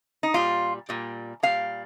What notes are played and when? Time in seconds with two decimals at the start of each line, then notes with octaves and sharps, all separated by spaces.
0.23 D#4
0.34 A#2 G3 F4
0.89 A#2 G3
1.43 A#2 G3 F5